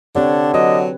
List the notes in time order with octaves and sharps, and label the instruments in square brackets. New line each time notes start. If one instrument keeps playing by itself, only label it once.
[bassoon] D3 [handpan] C4 G4 C#5 [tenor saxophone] D4
[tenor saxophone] F#3 [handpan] B4 [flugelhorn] D#5